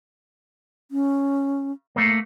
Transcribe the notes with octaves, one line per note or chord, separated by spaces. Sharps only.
C#4
A3 A#3